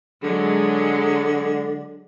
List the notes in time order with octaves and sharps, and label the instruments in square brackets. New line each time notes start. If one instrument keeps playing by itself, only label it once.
[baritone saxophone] D3 [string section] F#3 G#3